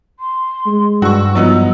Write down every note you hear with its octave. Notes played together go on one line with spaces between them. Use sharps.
C6
G#3
G2 F#4 C#6 E6
F3 F#3 B3 D#4